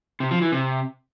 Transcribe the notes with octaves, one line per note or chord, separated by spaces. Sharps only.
C3
F3
E3
C3